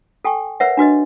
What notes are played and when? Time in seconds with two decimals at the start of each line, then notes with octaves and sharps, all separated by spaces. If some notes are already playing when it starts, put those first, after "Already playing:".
0.25 A4 G5 G#5 C#6
0.60 A#4 B4 C#5 E5 F#5
0.77 D4 F#4 B4 D#5